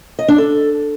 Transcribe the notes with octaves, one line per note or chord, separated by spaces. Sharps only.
D#5
D4
A4